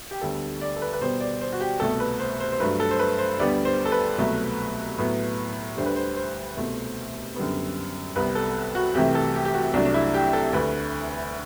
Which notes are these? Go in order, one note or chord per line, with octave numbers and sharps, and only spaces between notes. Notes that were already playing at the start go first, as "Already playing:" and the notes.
G4
D2 D3 G3 B3 A4
D5
A4
B4
B4
B2 G3 B3 C5
D5
C5
F#4
G4
C2 B2 A3 A4
B4
C5
C5
C5
G2 F#3 A3 B4
A4
C5
B4
C5
D2 D3 G3 B3 D5
C5
A4
B4
C2 B2 F#3 A3
A2 F#3 B3
D2 D3 G3 C5
B4
C5
C5
C2 B2 A3
F#2 D3 G3 B3
C2 C3 G3 B3 B4
A4
F#4
C2 C3 E3 A3 G4
A4
G4
G4
F#4
C2 C3 F#3 A3 D4
D4
E4
G4
A4
D2 D3 A3 B4